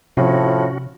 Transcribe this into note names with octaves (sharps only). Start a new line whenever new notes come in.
A2 C3 F3 C#4 F#4